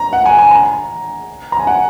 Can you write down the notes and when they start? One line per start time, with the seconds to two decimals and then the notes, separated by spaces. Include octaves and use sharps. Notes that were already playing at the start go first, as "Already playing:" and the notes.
Already playing: A#5
0.13 F#5
0.26 G#5
0.38 G#5
0.51 A#5
1.52 A#5
1.59 G#5
1.67 F#5